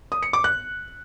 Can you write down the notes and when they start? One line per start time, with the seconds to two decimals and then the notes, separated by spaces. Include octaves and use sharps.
0.12 D#6
0.23 C#7
0.33 D6
0.44 F#6